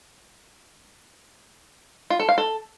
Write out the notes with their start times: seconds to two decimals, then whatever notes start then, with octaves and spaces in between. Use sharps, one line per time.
2.10 F4
2.19 A4
2.29 F5
2.38 A4